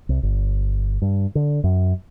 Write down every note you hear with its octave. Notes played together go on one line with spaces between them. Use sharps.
C2
G1
G2
D3
F#2